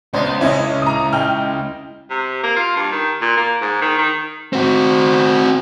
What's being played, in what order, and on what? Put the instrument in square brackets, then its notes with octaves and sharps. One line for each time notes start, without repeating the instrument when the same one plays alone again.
[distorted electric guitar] C#2 [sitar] B3 [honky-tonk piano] D4 C5 D#5
[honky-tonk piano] C#4 D#5 [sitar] E4
[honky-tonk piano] A#5 D#6
D#5 G5 F6
[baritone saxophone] C3
A#3
F4
G2
D#3
A#2
A#3
G#2
D#3
D#3
[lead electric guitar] C4 F#4